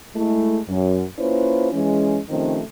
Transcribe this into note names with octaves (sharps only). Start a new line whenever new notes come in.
G#3 A3 E4
F#2
A#3 C#4 E4 F4 B4 C5
E3 G#3 C#4
C3 D#3 F3 A3 C4 C#4